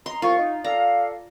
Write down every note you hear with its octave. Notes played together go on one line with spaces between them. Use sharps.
D#5 A#5 C6
C2 F4 C#6
D#4
A4 D5 F5 A#5